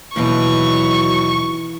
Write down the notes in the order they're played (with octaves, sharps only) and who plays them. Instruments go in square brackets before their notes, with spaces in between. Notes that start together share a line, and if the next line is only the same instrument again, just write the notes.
[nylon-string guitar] D#2 B2 [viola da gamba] E3 [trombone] F#3 [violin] C#6